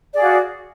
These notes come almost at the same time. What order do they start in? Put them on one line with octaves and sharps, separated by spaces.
D5 G#4 F5 F#4